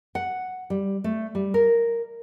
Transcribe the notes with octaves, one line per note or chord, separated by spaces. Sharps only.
F#5
G3
A3
G3
A#4